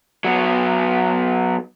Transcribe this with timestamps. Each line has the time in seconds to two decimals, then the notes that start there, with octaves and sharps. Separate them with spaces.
0.24 F#3 B3